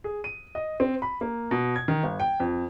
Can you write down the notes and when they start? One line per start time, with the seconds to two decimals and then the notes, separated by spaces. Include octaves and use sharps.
0.04 G#4
0.24 D#7
0.55 D#5
0.80 C4
1.02 B5
1.21 A#3
1.51 B2
1.76 G#6
1.88 D#3
2.03 G1
2.20 G5
2.40 F2